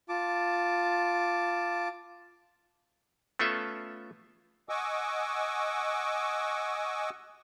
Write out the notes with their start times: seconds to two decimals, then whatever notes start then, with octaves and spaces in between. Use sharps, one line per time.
0.09 F4 A5 D6
3.39 A3 B3 C#4 F4 A4 E5
4.69 D#5 F#5 G#5 C#6 D6 E6